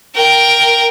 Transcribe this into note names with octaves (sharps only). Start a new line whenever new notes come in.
A#4 G5